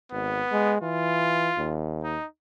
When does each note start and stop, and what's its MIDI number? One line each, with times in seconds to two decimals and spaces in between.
0.12 0.41 32
0.12 0.76 59
0.52 0.78 56
0.81 1.50 52
0.81 1.75 65
1.57 2.16 39
2.04 2.26 63